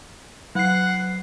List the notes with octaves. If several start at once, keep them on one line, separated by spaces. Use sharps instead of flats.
F#3 F#5 C7